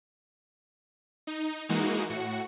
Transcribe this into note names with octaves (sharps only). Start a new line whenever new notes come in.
D#4
E3 G#3 A#3 D#4 F#4
A2 F#4 C#7